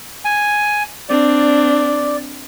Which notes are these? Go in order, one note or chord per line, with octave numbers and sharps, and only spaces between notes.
G#5
C4 D4 D5